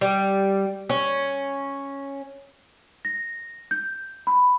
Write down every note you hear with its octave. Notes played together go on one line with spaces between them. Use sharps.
G3
C#4
A#6
G6
B5